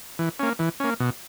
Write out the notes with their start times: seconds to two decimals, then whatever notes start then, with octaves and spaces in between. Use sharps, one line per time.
0.19 E3
0.40 A#3 C#4
0.59 E3
0.80 A#3 C#4
1.00 B2